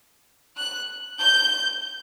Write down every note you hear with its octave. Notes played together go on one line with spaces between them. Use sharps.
F#6
G6